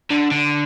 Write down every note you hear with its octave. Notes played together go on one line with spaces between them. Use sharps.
D3
D3